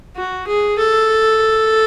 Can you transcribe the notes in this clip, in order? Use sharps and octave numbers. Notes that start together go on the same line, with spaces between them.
F#4
G#4
A4